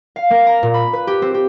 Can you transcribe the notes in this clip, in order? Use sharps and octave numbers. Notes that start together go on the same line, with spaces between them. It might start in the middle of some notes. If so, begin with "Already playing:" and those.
F5
A#3
A#5
A#2
B5
B4
G4
C4
G4